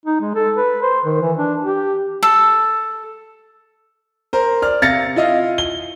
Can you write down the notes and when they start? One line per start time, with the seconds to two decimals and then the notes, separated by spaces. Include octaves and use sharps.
0.06 D#4
0.21 G#3
0.35 A4
0.57 B4
0.82 C5
1.05 D#3
1.21 E3
1.37 D4
1.64 G4
2.23 A4
4.33 A#4 C5
4.62 D5 F6
4.82 C3 F5 A6 A#6 C#7
5.16 E4 F4 D#5 F5
5.58 G7